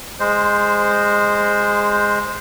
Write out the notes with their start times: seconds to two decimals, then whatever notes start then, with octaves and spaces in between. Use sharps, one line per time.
0.20 G#3 C5